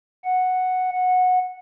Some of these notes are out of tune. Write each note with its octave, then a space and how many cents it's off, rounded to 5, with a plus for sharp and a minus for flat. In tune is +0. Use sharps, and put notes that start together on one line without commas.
F#5 -5
F#5 -15